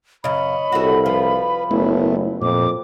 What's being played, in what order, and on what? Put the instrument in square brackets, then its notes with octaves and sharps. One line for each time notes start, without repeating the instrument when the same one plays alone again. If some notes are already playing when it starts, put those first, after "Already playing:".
[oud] F#2 C#3 [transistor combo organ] C#5 D#5 [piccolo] B5
[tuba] C2 [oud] F#4 A4
[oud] F3 [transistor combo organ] B4
[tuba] F#1 [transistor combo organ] A3 B3 E4
[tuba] F2 [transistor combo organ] A#2 [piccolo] D6